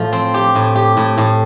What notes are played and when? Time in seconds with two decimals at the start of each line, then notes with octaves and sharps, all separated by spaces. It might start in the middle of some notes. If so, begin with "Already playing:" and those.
Already playing: A2 F3
0.13 C4
0.34 G4
0.55 A2
0.75 G4
0.97 A2
1.18 A2